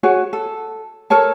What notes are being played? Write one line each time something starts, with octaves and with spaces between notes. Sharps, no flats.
F#4 G#4 C#5 G#5
A4
A4 A#4 C#5 A5